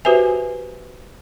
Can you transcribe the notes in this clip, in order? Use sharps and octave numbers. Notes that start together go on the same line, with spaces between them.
F#4 G4 B4 C5 E5 G#5